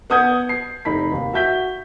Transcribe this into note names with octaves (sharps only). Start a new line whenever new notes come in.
B3 F#5 D#6 G6 G#6
C7
F1 D#4 B5 B6
D#2
F#4 E5 G6 B6 G7